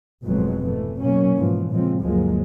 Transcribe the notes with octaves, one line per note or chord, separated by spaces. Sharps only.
F1 F2 G#2 B2 F#3 G#3
E3 A3
B2 F#3 A#3 C#4
G#2 B2 E3 F3
A#2 C#3 F3 G#3 C4
G1 D2 F3 F#3 G#3 A#3